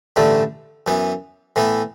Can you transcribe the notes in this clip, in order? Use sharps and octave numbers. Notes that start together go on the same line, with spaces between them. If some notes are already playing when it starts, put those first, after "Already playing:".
A1 G2 D3 A3 E4
F#2 E3 B3
A2 E3 B3 E4